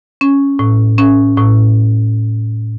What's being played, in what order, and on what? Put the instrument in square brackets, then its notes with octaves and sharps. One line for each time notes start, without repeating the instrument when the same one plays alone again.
[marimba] C#4
A2
C#4
A2